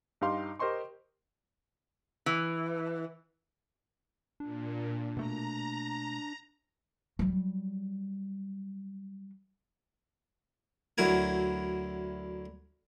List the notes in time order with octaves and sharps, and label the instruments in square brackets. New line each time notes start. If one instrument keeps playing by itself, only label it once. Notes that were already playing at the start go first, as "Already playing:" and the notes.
[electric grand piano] G2 D#4 G4 F5 C6
G4 A#4 C5 D#5 C6 C#6
[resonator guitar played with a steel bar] E3
[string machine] A#2 [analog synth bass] D4
[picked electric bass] B2 A3 A#3 [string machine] A#5
[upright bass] F#3 G3
[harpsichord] D2 F#3 E4 A#4 G#5